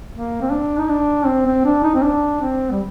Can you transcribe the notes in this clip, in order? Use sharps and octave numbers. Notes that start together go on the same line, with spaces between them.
A#3
C4
D4
D#4
D4
C4
C4
D4
D#4
C4
D4
C4
G3